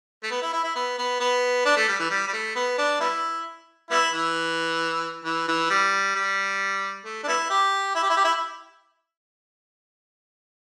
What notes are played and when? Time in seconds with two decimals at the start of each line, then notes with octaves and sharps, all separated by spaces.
0.23 A3
0.31 B3
0.42 E4
0.53 E4
0.64 E4
0.76 B3
0.98 B3
1.20 B3
1.65 D4
1.77 A3
1.88 G3
1.99 E3
2.10 G3
2.28 G3
2.33 A3
2.55 B3
2.78 D4
3.00 G3 B3 E4
3.91 G3 B3 E4
4.13 E3
5.25 E3
5.48 E3
5.70 G3
6.15 G3
7.05 A3
7.23 D4
7.28 G3 B3 E4
7.50 G4
7.95 E4
8.03 G4
8.10 E4
8.17 G4
8.24 E4